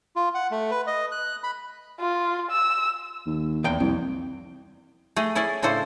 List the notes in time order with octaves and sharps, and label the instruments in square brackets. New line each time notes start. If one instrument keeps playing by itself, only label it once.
[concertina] F4
F#5
A3
B4
D#5
F#6
B5
[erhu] F4
E6
[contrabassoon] D#2
[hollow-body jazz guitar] E2 G5
[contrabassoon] C2 [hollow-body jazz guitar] F2
[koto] A3 G#4 D#5
C#4 E4 G#4 A4 D5
A2 C#3 D4 E4 A4 C5